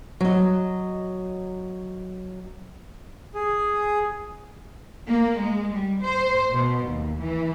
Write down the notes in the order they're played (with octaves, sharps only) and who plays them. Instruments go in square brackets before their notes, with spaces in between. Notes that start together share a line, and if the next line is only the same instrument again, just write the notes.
[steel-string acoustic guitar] F#3 D#5
[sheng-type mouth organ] G#4
[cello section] A#3
G#3
G3
C5
B2
D#2
E3